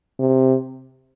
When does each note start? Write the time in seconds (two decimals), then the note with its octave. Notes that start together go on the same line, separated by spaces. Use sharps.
0.20 C3